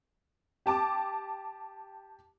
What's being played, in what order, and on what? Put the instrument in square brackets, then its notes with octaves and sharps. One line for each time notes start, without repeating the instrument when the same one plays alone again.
[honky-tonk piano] G4 A5 D6